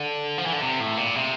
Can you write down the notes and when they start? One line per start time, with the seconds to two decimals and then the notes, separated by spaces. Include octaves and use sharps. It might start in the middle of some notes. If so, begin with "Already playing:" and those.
Already playing: D3
0.38 F3
0.46 E3
0.53 D3
0.61 C3
0.80 A2
0.97 A#2
1.16 C3